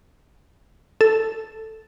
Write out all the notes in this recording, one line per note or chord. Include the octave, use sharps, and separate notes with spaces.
A4